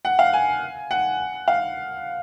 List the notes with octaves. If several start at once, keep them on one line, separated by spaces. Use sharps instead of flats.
F#5
F5
G#5
F#5
F5